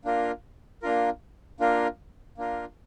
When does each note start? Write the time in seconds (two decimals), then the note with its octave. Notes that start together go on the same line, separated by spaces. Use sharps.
0.05 A#3 D4 F4 A#4
0.82 A#3 D4 F4 A#4
1.60 A#3 D4 F4 A#4
2.38 A#3 D4 F4 A#4